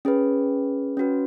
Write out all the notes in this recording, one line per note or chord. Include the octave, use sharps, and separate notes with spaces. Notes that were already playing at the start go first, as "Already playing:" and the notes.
C#4 G#4 B4
C#4 F#4 B4